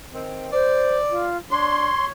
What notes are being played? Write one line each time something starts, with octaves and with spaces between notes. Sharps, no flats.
D#3 C4
C5 D5
F4
D4 C#5 C6